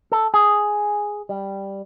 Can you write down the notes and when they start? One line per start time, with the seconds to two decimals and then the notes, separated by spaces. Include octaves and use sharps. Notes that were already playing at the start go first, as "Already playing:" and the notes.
0.12 A4
0.34 G#4
1.29 G3